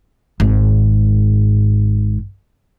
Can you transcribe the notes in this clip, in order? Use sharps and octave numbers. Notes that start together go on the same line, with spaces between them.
G#1 G#2